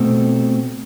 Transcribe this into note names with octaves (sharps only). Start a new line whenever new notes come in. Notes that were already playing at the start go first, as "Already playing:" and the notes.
Already playing: B2 A3 C4